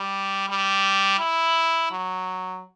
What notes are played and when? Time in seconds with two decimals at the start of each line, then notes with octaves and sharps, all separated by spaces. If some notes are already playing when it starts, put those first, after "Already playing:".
Already playing: G3
0.50 G3
1.20 E4
1.91 F#3